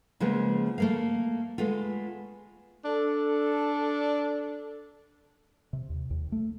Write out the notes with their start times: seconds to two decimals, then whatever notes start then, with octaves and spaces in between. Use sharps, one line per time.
0.20 C#3 F3 G#3 A#3 B3
0.78 A3 A#3 F5
1.58 G#3 A3 B3 F4
2.85 D4 A4
5.73 C3
5.89 D#2
6.10 D#2
6.32 A3